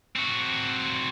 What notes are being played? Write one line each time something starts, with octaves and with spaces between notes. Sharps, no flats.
C4 F#4